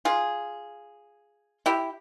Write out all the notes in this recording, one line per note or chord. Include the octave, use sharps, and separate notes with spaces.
F4 G#4
E4 G4